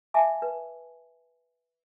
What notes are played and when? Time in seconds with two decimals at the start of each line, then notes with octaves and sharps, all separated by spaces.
0.14 E5 F5 G#5 A5 D6
0.42 B4